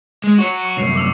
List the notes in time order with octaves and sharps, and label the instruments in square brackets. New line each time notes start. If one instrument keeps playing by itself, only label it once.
[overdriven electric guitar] G#3
[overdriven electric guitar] F#4 C#5 [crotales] C#6 C#7
[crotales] C#6
[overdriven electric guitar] C2 F#2 [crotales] C7 F7
[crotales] D6 E6 F7